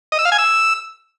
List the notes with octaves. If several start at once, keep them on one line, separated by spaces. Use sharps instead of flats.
D#5
E6
F5
G#5
E6